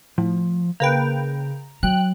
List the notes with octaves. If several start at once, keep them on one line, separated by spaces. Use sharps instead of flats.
A2 F3
C#3 A#3 B4 G5 A#5
F#3 G5 F#6